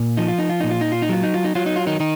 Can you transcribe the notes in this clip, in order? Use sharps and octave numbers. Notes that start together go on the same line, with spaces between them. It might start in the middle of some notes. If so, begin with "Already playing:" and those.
Already playing: A#2
F3 D#4
F4
D#4
F4
A#2 D#4
F4
D#4
F4
D#4
F#3 F4
D#4
F4
D#4
F#3 F4
D#4
F4
D#3 D#4
D#3 D#4